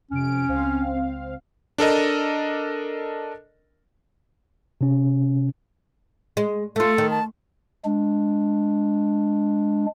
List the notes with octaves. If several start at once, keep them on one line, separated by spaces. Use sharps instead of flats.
F2 C3 C#4 D7
C#2 C4 F5
D4 A4 A#4 D#5
C3 C#4
G#3
A3 F4 A4
D#3
A5
G#3 D4